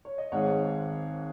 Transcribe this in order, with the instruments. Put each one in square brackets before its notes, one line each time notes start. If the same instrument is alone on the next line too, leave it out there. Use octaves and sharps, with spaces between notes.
[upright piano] C#5
D#5
G#1 G#2 G#3 C#5 F#5